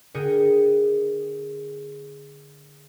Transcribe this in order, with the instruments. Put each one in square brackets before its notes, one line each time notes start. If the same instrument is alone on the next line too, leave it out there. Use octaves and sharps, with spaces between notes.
[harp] D3 G#4 A#4 G5 C#7